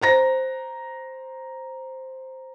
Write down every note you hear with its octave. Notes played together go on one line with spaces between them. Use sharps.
C5 A#5 A#6